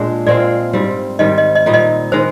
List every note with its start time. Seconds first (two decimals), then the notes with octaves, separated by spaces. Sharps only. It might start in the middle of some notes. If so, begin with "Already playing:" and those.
Already playing: A#2 G#3 D4
0.26 A#2 G#3 C4 F4 D5
0.73 G#2 G3 C4
1.19 G#2 D#3 G3 D#5
1.38 D#5
1.55 D#5
1.66 A#2 G3 C4 D#4
1.74 D#5
2.12 D#3 G#3 C5